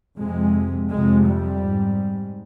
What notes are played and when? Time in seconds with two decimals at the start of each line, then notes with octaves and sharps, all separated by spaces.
0.18 F2 C3 G#3
0.90 F2 C3 G#3
1.26 G3
1.62 G#2